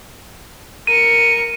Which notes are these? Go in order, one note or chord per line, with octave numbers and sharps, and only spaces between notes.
A#4 C#7 D#7